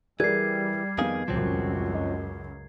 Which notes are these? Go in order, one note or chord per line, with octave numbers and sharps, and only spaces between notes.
E3 G3 G#4 A#4 D5 G#6 C7
F2 D#3 B3 G#4 F5
D#1 C#2 F#2 F3 F#3 C4
D#5